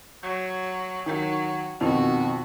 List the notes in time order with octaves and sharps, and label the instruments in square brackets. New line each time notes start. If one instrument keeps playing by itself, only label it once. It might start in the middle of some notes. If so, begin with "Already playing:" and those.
[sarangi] F#3
[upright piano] D#3 [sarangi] F#3
[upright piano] F2 B2 D#3 [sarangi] F#4